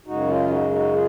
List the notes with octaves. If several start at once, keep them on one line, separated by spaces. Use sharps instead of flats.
F#2 C#3 G#3 D#4 F#4
C#4 F4
D#4 F#4
D#4 F#4
F4 G#4